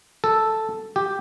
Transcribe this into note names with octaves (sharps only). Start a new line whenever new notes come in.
A4
G4